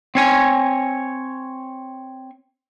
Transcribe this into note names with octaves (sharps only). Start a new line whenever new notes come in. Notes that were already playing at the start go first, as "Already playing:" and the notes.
C4 C#5 G#5